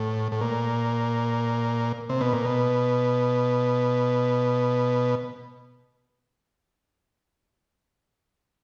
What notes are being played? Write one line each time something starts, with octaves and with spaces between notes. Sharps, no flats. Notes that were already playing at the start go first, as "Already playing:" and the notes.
Already playing: A2
A2
A#2
C3
B2
A#2
B2